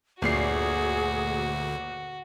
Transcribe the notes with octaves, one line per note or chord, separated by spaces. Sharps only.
G1 D2 A#2 F#4 G#4 C7